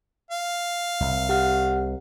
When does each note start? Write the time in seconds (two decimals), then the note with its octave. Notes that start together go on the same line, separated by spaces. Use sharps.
0.31 F5
1.00 C2
1.29 G4 F#5 F6